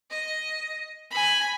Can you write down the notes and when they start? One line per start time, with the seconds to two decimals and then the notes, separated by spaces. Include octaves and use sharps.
0.11 D#5
1.11 G#5 B5